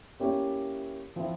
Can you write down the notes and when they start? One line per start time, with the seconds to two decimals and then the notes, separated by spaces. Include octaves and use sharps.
0.20 A#3 C#4 E4 G4 C#5
1.16 F3 C4 E4